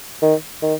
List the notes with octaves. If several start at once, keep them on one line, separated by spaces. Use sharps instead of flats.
D#3
D#3